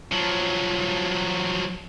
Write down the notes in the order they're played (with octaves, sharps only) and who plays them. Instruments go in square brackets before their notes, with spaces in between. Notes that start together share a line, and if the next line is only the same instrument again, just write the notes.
[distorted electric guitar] F3 F#3